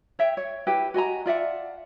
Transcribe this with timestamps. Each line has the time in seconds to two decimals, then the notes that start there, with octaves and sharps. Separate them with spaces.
0.19 C#5 E5 G5
0.37 C#5
0.67 E4 G4 B4
0.94 F#4 D#5 G#5 A#5
1.26 F4 D5 E5 F#5